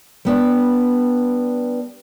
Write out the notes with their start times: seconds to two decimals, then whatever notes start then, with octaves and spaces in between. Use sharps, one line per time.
0.25 G3 B3 D4